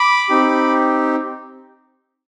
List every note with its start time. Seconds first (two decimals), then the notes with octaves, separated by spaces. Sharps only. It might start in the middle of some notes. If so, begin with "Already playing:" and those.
Already playing: B5 D6
0.29 C4 D#4 G4